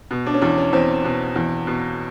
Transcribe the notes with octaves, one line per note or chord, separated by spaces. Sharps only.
B2
D4
C#4
E2 D4
C#4
E2 C4
B2
E2
B2